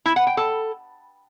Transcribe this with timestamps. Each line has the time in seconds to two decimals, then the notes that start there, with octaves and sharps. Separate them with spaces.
0.06 E4
0.16 F#5
0.27 G5
0.37 A4